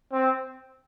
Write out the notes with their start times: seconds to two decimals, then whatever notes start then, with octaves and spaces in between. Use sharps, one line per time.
0.12 C4